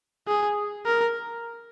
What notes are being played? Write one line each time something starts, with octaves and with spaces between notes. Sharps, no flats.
G#4
A#4